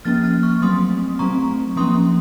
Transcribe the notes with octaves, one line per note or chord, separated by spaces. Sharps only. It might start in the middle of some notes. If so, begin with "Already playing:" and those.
F3 A#3 C#4 F6 A6
F6 A6
C#6 F6
F#3 A3 C4 C6 D#6
F#3 A3 C4 A#5 C#6
F3 A#3 C#4 C6 D#6